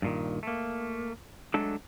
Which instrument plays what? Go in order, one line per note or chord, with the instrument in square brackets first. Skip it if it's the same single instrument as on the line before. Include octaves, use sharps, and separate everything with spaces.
[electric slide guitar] G2 A#2 D#3
A3 A#3
F#3 G#3 A3 D4 A4